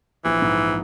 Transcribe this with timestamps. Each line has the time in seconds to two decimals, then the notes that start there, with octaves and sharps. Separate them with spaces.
0.25 A#1 E3
0.42 G#2